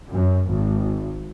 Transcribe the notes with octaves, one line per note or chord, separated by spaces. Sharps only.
F#2
G#1